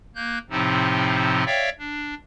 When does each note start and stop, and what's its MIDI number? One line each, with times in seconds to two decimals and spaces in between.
0.15 0.38 58
0.15 0.38 90
0.15 0.38 91
0.50 1.44 45
0.50 1.44 48
0.50 1.44 53
0.50 1.44 60
0.50 1.44 63
1.46 1.70 73
1.46 1.70 74
1.46 1.70 76
1.46 1.70 77
1.46 1.70 79
1.79 2.14 62